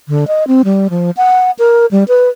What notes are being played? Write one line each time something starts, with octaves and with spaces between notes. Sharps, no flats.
D3
D#5
C4
G3
F3
F#5
A#4
G3
B4